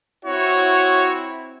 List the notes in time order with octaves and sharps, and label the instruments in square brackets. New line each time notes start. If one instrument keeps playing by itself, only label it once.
[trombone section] C4 E4 [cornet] F#4 [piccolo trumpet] C#5